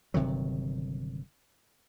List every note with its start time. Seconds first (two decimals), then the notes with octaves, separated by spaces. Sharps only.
0.14 G1 C3 D#3 F#3